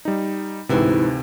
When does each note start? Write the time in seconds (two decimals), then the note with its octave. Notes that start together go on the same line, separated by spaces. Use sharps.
0.05 G3 D#4
0.69 D2 G#2 C3 E3 E4